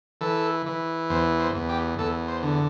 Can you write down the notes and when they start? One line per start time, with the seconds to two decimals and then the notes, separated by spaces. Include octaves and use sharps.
0.21 E3 A4
0.66 E3
1.10 E2 C5
1.40 C5
1.55 E2
1.69 G4
1.99 E2 A4
2.28 C5
2.43 D3